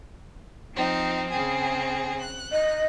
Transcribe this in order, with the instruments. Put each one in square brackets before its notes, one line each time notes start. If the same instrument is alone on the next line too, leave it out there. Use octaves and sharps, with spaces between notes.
[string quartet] F3 C4 D#4
C#3 C4 G#4
F#6
[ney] D#5